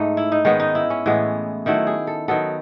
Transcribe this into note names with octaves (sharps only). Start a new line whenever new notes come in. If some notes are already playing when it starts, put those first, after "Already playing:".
Already playing: G#2 A3 D#4
E4
D#4
D#3 G#3 B3 C#4
D#4
E4
C#4
A2 E3 G#3 B3
D#3 F#3 A3 E4
G#4
A4
D#3 F#3 B3 A4